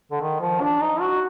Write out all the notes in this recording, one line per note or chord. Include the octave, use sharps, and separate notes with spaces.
D3
D#3
F3
D4
D#4
F#4